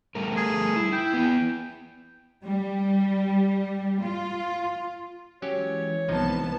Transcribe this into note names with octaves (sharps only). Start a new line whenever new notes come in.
G3 A3 A#4
G#4
E4
E4 G5
B3 E4
G3
F4
E3 F#3 G#3 C#4 G4 C#5
C2 C3 F3 B3 D#4 A5